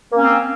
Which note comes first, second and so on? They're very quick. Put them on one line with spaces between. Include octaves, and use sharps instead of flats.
A#3 C#4 C4